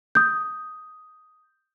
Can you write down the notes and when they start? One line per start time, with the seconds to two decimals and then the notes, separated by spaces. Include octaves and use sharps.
0.15 D#6 G6